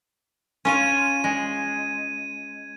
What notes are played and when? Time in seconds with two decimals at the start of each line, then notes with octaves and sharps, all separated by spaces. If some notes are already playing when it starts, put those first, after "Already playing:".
0.65 C#4 F4 G#6 D#7
1.24 G#3